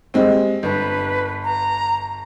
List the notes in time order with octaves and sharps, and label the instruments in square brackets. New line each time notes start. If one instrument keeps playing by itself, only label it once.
[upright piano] G3 G#3 C4
[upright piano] G1 [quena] B4
[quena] A#5